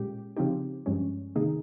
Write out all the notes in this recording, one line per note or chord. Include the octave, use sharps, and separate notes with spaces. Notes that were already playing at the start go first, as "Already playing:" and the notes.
Already playing: A#2 G#3 C#4 G4
C#3 F3 C4 D#4 G4
G2 F3 G#3 C#4
C3 D#3 A#3 D#4 G#4